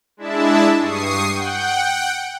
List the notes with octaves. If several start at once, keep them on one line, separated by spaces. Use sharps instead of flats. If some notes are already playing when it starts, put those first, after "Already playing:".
G#3 D4 E4 E5 A5
G2 C#6 D#6 C7
F#5 G5